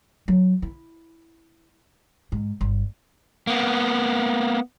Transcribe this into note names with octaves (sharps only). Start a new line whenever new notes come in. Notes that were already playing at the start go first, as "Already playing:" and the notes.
F#3
E4
G#2
G1
A#3 B3